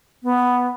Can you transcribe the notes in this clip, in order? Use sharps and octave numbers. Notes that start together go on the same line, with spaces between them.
B3